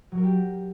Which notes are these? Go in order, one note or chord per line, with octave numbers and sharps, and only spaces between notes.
F#3
A#4
G4